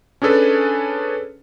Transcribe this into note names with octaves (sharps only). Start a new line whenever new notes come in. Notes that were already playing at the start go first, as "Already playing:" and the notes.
C#4 D4 G#4 A4 B4